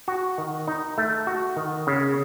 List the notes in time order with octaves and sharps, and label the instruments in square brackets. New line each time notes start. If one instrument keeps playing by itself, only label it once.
[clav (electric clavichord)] F#4
D#3
D#4
A3
F#4
D#3
C#3